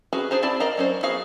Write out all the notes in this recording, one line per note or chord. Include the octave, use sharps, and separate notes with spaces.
C#4 F#4 G#4 B4
D4 G#4 C5 A#5
C4 E4 D5 A5
A#4 D5 D#5 F5 A#5
F#3 C#4 C5
B3 F#4 G#4 F5